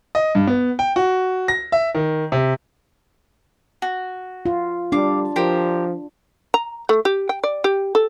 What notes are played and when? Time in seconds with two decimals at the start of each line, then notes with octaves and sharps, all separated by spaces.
0.15 D#5
0.35 G2
0.47 B3
0.79 G5
0.96 F#4
1.48 A#6
1.72 E5
1.95 D#3
2.32 C3
3.82 F#4
4.46 F4
4.92 G3 D4 F5 D6
5.36 F3 G4 A#4 C5
6.54 A#5
6.89 A3
7.05 G4
7.29 G5
7.44 D5
7.64 G4
7.95 A4